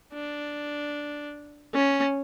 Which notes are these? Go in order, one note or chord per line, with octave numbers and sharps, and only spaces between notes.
D4
C#4